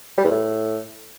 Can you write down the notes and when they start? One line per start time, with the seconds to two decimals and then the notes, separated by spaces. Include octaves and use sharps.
0.18 G3
0.24 E2
0.31 A2